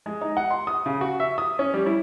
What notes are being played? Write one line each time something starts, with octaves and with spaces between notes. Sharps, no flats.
G#3
D#4
F#5
C6
D#6
C#3
F#4
E5
D#6
C#4
G3
E4